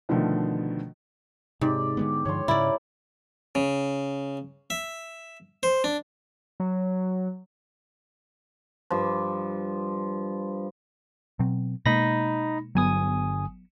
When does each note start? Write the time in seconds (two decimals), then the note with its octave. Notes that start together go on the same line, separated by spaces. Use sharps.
0.09 B2 D3 D#3 F3 A3
1.61 G#2 C3 G4 D5
1.97 D3 G#3 B3
2.25 G2 D3 F3 C#5 C6
2.48 G#2 C#3 E4 A#4 C#5 D5
3.55 C#3
4.70 E5
5.63 C5
5.84 D4
6.60 F#3
8.90 G2 F3
11.39 B2 F#3 C4
11.86 B2 G#3 A#3 D#4 B5 A#6
12.75 G1 F#3 B3 G#5 D#6